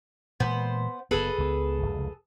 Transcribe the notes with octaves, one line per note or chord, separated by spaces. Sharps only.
A#2 E3 G#3 B3 C5
F#1 B3 G#4 A4 B4
C#2 G3 B3
F1 C#2